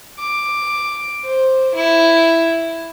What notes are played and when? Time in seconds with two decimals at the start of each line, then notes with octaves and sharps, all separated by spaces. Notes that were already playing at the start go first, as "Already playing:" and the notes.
0.19 D6
1.25 C5
1.75 E4